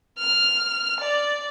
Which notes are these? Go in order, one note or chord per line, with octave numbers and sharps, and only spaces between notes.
F6
D5